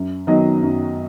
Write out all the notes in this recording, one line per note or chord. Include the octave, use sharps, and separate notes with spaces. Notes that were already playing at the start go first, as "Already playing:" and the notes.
Already playing: F#2
D#3 F#3 B3 D#5
F#2